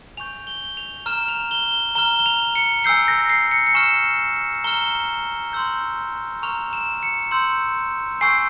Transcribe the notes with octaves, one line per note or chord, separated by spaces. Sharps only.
G#5 C#6 G6 F7
G7
F7
A#5 F6 E7
F7
G7
G7
A#5 F6 G7
G7
F7
C#7
G#5 E6 G6 C7
A#6
C7
C#7
C#7
G#5 C#6 F6 E7
A#5 F6 G7
C6 E6 G6
A#5 C#6 F6 F7
E7
C#7
C6 E6 G6
G#5 C#6 E6 G6 C7